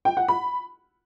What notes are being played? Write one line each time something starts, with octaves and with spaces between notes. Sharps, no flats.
G5
F#5
B5